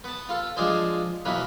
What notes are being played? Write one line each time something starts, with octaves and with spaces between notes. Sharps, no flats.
B3 A5
F4 A4
F3 G#3 D4 G#4 C5
B2 E3 F#3 A#3 B5